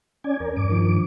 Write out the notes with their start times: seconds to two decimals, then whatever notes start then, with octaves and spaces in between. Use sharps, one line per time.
0.24 C#4 D5 G#5
0.40 E2 A#4
0.56 G2 D6
0.70 D#3 F3 D4